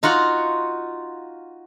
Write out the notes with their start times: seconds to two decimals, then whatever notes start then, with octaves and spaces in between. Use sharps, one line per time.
0.03 D#4 F4 F#4 F#5